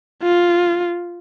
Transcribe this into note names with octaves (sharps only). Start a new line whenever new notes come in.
F4